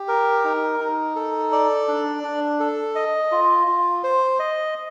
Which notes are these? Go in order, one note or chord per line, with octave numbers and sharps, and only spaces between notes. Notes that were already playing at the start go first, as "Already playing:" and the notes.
Already playing: G4
A#4
D#4
D#4
A4
D5
D4
D4
A4
D#5
F4
F4
C5
D#5